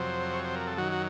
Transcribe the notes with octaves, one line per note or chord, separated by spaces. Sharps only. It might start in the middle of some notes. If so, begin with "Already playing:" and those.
Already playing: F2 C3 F#3 C5
C#5
C5
A#4
A4
F#2 D#3 F#3 F#4
F#4